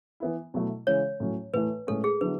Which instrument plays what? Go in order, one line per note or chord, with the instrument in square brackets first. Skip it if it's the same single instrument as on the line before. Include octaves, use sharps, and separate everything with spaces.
[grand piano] E3 B3 E4
B2 F#3 A3 E4
[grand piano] C#3 E3 G#3 C#4 [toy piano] C#5
[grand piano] A2 F#3 C#4
[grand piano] A2 E3 A3 [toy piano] B4
[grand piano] A2 G#3 C#4 [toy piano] A4
[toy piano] G#4
[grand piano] D3 F#3 B3 E4 [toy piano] B4